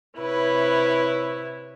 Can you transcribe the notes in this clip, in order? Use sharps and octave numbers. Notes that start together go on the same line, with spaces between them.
C3 E4 B4 C#5